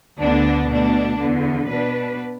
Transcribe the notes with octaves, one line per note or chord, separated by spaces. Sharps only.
D2 D3 B3 D4
B2 A3 D4
E2 D3 B3
B2 B3 D4 B4